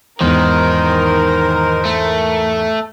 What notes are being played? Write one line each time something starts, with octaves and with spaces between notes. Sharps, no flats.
E2 G#2 D#3 A#4 C5
A3